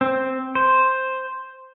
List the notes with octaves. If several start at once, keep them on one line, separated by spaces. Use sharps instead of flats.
C4
C5